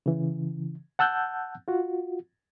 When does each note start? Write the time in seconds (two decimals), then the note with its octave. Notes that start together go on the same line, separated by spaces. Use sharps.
0.06 C#3 E3
0.99 F#5 A5 E6 F#6 G6
1.68 F4 F#4